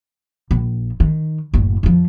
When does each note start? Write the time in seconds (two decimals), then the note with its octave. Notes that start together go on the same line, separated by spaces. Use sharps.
0.51 A#1
1.00 D#3
1.54 F#1 A2
1.83 F2 F3